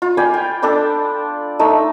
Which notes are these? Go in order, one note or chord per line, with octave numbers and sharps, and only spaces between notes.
F4
D5 G5 G#5 B5
G5
D4 A4 D5 B5
A3 D#4 A5 E6